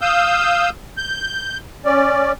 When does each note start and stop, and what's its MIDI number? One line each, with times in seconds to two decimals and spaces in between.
0.01 0.70 77
0.01 0.70 87
0.01 0.70 88
0.01 0.70 91
0.97 1.58 91
1.85 2.32 61
1.85 2.32 74